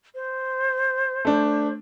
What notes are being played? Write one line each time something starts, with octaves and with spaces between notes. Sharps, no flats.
C5
A3 D4